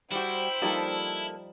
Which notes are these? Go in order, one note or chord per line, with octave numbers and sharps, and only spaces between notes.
G3 E4 F#4 C5 G5
F3 G3 A#3 D#4 A4